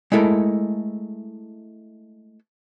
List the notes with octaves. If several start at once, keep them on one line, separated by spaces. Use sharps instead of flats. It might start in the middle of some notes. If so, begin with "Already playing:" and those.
G#3 A3 E4 A4 A#4